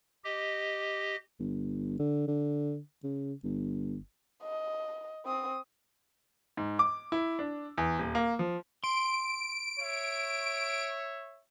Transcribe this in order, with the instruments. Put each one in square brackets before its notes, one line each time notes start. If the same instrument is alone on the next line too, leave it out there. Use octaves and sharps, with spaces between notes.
[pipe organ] G4 D#5
[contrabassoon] G1
D3
D3
C#3
G1
[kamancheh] D#5
C4 D#6
[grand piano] G#2
D6
E4
D4
E2
D#1
A#3
F3
[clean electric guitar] C6 [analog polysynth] D7
[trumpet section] C#5 E5